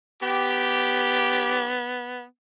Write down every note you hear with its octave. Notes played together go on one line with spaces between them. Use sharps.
B3 G4